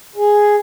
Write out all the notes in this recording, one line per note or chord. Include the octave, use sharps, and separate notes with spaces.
G#4